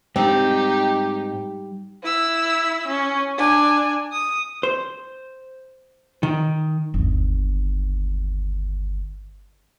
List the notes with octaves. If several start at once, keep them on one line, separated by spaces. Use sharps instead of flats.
G#2 G3 C4 D#4 G4
E4 E6
C#4
D4 G#5
D#6
C5
D#3
G1 D#2